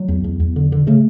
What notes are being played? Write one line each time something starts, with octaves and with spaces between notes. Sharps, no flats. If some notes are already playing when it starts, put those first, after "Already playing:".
Already playing: F#3
E2
E2
E2
D3
D3
C#3 A3